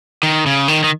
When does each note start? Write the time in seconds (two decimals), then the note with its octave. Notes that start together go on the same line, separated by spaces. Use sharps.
0.23 D#3
0.46 C#3
0.68 D#3
0.84 D#3